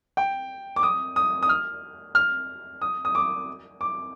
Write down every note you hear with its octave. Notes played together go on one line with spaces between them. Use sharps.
G5
D6
D#6
D#6
D#6
F6
F6
D#6
D#6
D6
D6